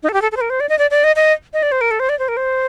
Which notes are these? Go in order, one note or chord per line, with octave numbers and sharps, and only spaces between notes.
D#4
A4
G4
A4
A4
C5
A#4
C5
D5
D#5
D5
D5
D#5
D#5
D#5
D5
C5
A#4
A4
C5
D5
C5
A#4
C5